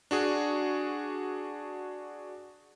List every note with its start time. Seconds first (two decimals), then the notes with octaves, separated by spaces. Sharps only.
0.11 D4 F#4 G#4